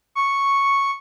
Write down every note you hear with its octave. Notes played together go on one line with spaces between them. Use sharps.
C#6